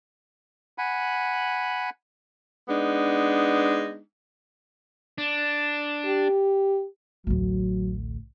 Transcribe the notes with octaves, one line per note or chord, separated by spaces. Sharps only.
F#5 G#5 B5
G#3 B3 D4 D#4
D4
G4
A1 D2 F#3